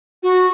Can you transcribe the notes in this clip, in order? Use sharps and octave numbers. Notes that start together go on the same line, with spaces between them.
F#4